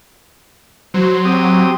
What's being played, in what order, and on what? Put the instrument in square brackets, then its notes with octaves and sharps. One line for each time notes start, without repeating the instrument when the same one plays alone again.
[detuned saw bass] F#3 [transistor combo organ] C5
[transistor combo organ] C4 G4 D#6